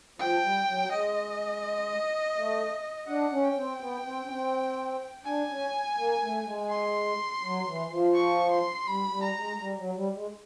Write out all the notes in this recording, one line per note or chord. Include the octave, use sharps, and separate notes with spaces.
F3 G5
G3
F#3
G#3 D#5
A3
D4 F#5
C#4
G5
C4
B3
C4
C#4
C4
D4 G#5
C#4
A#3
A3
G#3
C6
F#3
E3
F3
C#6
C6
G3 B5
G3
A#5
G#3
G3
F#3
G3
G#3